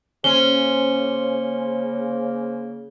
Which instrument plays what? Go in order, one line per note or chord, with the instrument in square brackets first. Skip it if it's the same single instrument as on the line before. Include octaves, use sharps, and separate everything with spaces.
[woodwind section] C#3 A#3 [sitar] C#4 [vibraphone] C5 G#5 C6 [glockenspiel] G7